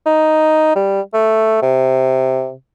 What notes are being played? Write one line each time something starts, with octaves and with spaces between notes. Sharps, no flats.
D#4
G3
A3
C3